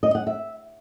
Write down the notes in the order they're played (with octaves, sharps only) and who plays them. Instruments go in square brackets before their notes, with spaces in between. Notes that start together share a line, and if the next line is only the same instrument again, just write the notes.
[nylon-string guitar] D#5
F#5
E5